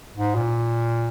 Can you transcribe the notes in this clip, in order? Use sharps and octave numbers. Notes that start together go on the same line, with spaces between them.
G#2
A#2